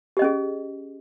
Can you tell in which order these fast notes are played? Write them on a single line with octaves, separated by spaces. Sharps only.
G4 D#5 C#4 G#4